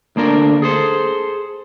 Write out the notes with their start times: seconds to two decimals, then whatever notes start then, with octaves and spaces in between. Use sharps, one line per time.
0.16 D2 A#3 D4 A#4
0.62 G#4 A4 C5